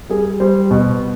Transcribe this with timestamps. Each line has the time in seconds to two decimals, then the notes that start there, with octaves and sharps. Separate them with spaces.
0.09 G3 G#4
0.40 G3 C5
0.71 B2